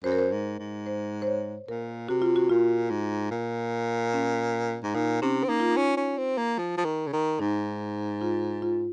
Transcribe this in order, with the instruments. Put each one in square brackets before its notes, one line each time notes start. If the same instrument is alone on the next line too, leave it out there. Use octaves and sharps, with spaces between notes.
[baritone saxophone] F#2 [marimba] C5
[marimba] A#4
C5
[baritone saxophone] G#2
G#2
[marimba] C5
C5
C#5
[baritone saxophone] A#2 [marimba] A#4
[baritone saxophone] C3 [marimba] F#4
[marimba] F4
F#4
[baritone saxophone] A#2 [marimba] F4
[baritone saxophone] G#2
A#2
[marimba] C#4
[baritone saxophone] G#2
[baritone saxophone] A#2 [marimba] D#4
[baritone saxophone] C3 [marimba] C#4
[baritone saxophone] C4
[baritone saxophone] A#3 [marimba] D#4
[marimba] F4
D#4
[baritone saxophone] C#4
C#4
C4
A#3
F3
F3
D#3
C#3
D#3
[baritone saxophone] G#2 [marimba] D#4
[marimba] F4
F4